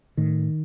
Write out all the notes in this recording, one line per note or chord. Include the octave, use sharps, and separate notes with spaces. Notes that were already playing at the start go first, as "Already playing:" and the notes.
A2 D#3